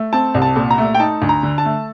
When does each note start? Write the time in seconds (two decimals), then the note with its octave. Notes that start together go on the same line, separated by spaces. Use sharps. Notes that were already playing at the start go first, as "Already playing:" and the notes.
Already playing: A3
0.13 C4 A5
0.34 C2
0.42 A5
0.56 A#2
0.70 A#5
0.78 A3
0.95 G5
1.00 D#4 A5
1.22 D2
1.29 A#5
1.43 D3
1.58 A5
1.65 A3